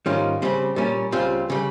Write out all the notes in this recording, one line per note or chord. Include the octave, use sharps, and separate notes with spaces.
G#2 D#3 G3 C#4 F4
C#3 G3 C4
A#2 G3 C#4
C#2 C#3 G3 C4 F4
C#3 G3